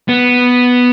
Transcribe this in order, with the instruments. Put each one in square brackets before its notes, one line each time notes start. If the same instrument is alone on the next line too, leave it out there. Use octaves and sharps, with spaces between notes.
[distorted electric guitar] B3